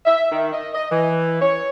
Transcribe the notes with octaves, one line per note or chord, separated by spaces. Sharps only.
E5
D#3
D#5
D#5
E3
C#5